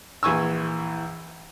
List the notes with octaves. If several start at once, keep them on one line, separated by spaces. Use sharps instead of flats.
A#1 E3 G#5 C#6 E6